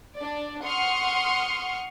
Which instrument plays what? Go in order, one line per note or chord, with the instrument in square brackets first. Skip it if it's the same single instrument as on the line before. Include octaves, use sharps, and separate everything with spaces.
[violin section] D4 D5
F#5 C6 C#6 D#6 F6 C#7